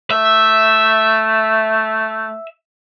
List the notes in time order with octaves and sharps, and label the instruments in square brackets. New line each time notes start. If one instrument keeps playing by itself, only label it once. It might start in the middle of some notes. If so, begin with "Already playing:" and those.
[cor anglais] A3 [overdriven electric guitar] E5